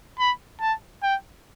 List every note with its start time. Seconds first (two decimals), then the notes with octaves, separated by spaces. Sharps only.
0.19 B5
0.61 A5
1.03 G5